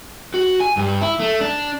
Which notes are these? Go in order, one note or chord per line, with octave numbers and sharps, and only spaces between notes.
F#4
G#5
G2
E4
A3
D4